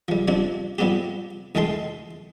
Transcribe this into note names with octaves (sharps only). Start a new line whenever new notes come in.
F3 G3
F3 G3 C4 D4
F3 G3 B3 C4 G4
D2 E3 G#3 A4 G5 C6